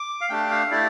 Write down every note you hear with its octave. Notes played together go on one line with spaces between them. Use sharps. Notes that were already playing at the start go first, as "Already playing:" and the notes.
Already playing: D6
F5
A3 D4 G4 G5
F5
A3 E4 G4 D5